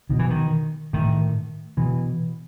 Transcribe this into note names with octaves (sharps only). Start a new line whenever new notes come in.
B2 D#3
E3
D#3
A2 D#3
B2 E3